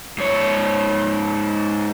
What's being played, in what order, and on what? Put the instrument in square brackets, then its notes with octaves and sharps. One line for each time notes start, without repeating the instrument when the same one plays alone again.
[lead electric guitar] G#2 C#5